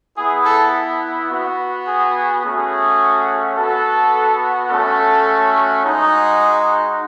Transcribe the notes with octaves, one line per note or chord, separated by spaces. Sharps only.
B3 E4 G#4
A4
B3 F#4
G#4
A3 C#4 F#4 G#4
B3 F#4 A4
A3 C#4 F#4 A4
G#3 D#4 F#4 G#4